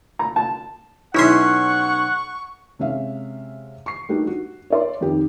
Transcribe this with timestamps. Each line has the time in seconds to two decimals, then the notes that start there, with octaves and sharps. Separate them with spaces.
0.19 A#5
0.36 A5
1.15 B1 C#4 E4 E5 F#5 C6 C#6
2.79 C3 G#3 C#4 E5 F5
3.86 C#6 C7
4.09 G3 A3 D4 D#4 F#4 G4
4.27 F#4
4.70 C#5 D5 C6
5.01 F2 D#3 G4